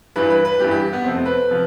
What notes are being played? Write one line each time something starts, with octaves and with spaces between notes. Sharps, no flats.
G2 E3 G3 B4
B4
B4
G2 E3 G3 G4
G4
B3
F2 C3 F3 A3 C4
B4
C3 F3